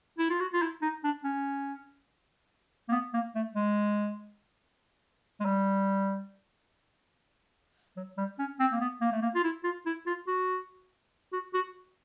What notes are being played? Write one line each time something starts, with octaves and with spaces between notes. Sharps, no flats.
E4
F4
F#4
F4
E4
D#4
D4
C#4
A#3
B3
A#3
A3
G#3
G#3
G3
F#3
G3
C#4
C4
A#3
B3
A#3
A3
A#3
F4
E4
F4
E4
F4
F#4
F#4
F#4